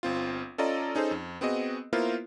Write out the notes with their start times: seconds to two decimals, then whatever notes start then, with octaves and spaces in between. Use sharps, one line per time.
0.03 G1 C4 F4
0.58 C#4 F4 A4 D5 D#5 A#5
0.95 C#4 D#4 G#4 A4 C5
1.11 F2
1.41 B3 C4 F#4 G#4 D#5
1.93 A#3 B3 E4 F4 A#4 C5